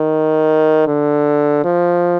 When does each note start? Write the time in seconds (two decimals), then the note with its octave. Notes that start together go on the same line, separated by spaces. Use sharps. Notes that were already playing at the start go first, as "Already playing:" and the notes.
Already playing: D#3
0.87 D3
1.65 F3